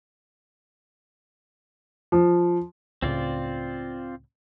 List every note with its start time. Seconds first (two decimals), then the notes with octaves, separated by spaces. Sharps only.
2.12 F3
3.02 C#2 A2 C#3 C4 F4 D5